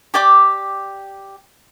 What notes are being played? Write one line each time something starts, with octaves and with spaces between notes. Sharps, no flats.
G4 D5 G5 D6